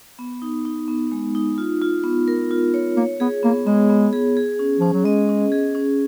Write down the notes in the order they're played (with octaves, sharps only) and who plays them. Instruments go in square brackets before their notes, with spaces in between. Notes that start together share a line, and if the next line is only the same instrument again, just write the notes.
[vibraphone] B3
D#4
D#4
B3
G#3
D#4
F4
F4
B3
A#4
F4
C#5
[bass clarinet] A#3 [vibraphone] C#5
[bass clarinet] B3 [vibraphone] G#4
[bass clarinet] A#3 [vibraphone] B3
[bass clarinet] G#3 [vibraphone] B3
[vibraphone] B3
G#4
G#4
C#4
[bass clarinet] F3 [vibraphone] C#4
[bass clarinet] F#3
[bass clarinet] G#3 [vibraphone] D#5
[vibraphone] C#4
G#4
C#4